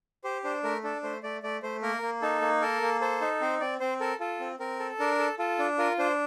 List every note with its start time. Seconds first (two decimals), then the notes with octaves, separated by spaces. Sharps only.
0.24 G4 C5
0.44 D4 C5
0.64 A3 A#4
0.84 D4 A4
1.03 A3 C5
1.23 A3 D5
1.43 A3 D5
1.63 A3 C5
1.82 A#3 A#4
2.02 A#3
2.22 D#4 A4
2.41 A#3
2.62 A4 A#4
2.82 A#3
3.01 A4 C5
3.21 D#4
3.41 C4 C5
3.60 C4 D5
3.80 C4 C5
4.00 A4 A#4
4.20 F4 A4
4.40 C4
4.59 C4 A#4
4.79 A4
5.00 D4 A#4
5.19 A4
5.39 F4 A4
5.59 D4
5.78 F4 A#4
5.99 D4 C5